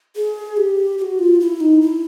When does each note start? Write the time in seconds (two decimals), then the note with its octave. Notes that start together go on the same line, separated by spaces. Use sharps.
0.16 G#4
0.57 G4
0.98 G4
1.02 F#4
1.19 F4
1.40 E4
1.60 D#4
1.81 E4